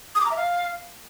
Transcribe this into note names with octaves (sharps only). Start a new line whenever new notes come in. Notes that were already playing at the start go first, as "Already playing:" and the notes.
D#6
D6
A#5
E5
F5